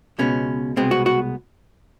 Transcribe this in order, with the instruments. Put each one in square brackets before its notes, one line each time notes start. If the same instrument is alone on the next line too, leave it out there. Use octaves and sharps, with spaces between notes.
[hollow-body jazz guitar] C#2 B2 G#3 B3 C#4
C2 B2 G#3 B3 C4
F#4
F#4